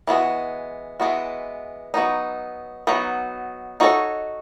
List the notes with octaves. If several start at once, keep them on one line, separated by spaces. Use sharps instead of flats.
E3 G#3 B3 F#4
E3 G#3 B3 F#4
F#3 B3 D#4
F#3 B3 D#4
D#4 F#4 A4 C#5